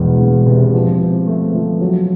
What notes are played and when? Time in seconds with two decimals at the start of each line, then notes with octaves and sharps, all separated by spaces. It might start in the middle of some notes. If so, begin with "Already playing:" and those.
Already playing: E1 E2
0.20 E1
0.46 C3
0.74 F3
1.01 C4
1.27 A3
1.54 F3
1.81 F#3